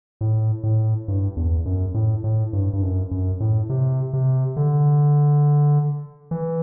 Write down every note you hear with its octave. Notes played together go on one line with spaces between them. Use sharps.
A2
A2
G2
E2
F#2
A2
A2
G2
G2
F#2
F#2
A2
C3
C3
D3
E3